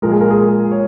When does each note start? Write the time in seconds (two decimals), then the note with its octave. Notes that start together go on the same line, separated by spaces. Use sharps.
0.02 A#2 F3 G#3 A#4
0.12 G#4
0.21 A#4
0.30 G#4
0.72 C#5